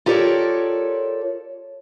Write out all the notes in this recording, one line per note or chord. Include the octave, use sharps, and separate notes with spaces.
F4 G4 A4 A#4 C#5 D5